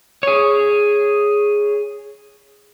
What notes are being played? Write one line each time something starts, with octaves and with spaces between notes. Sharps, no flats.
G#4 C#5